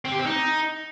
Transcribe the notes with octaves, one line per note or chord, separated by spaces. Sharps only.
C4
G4
C4
D#4